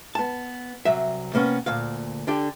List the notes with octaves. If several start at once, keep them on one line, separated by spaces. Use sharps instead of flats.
B3 A5
C2 F#3 E5
C3 A#3 B3 C#4
D2 A#2 F5
D3 D4 G4